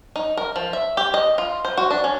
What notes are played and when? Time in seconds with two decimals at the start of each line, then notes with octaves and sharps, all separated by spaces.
0.16 D#4
0.37 A#4
0.56 F3
0.73 E5
0.97 G4
1.14 D#5
1.38 F4
1.65 C5
1.77 F#4
1.91 D4
2.04 C#4